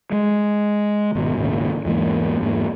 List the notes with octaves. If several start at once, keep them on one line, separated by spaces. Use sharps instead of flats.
G#3
G#1 B2
G#1 D#2 A#2 C#3
E2 G#2 E3 A#3
E2 G#2 A#3